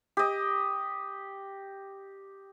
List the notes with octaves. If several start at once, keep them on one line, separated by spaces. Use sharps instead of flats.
G4 D#5